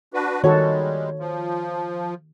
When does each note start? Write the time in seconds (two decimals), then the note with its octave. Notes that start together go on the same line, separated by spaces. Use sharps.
0.14 D4 F#4 B4
0.44 D#3 G3 G#3 F#4 A4 C#5
1.19 F3